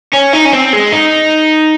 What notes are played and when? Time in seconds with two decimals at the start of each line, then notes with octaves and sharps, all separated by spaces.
0.13 C#4
0.33 D#4
0.45 C#4
0.53 C4
0.73 G#3
0.92 D#4